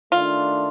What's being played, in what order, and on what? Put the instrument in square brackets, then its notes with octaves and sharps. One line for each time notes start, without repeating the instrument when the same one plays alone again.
[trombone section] D#3 A3 D4 [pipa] F4